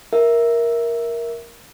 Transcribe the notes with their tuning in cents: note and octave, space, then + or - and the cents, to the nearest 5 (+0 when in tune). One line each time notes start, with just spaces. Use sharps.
A#4 +10 E5 +0